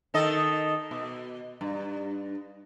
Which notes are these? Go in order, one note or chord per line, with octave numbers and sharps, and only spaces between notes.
D#3 A4 D#5
B2
G2